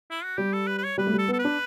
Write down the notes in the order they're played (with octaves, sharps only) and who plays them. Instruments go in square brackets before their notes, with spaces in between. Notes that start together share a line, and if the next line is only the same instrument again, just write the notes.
[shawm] E4
F#4
[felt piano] G3 [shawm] G4
[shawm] A4
B4
B4
C#5
[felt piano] G3 [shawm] B4
[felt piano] A3
G3
[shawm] A4
[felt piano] B3
[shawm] A4
B4
[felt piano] D4